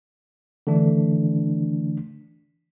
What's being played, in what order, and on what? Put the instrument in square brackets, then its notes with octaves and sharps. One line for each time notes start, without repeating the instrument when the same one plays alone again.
[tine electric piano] D3 E3 A3 D4